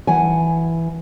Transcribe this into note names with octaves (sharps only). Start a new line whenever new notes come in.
E3 F#5 G#5